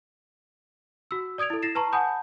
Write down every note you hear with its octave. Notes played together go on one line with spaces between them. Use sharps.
F#4 E6
D5 D#6 G#6 D7 F7
E4 A4
E4 A6 A#6 C7 E7
B4 A5 A#5 C#6
F#5 G#5 A5 B5 D#6 G6